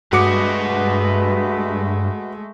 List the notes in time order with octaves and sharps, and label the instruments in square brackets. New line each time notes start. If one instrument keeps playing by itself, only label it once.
[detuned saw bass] G2 [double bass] G#3 A3 [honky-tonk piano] F#4 D6 C#7 [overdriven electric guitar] B4 D#5